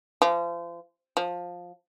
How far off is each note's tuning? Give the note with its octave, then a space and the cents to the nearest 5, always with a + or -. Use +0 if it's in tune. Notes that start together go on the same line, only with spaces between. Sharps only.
F3 -35
F3 +15